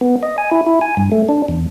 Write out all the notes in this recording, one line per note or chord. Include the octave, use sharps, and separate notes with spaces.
B3
D#5
G#5
E4
E4
G#5
G2
A3
D4
E2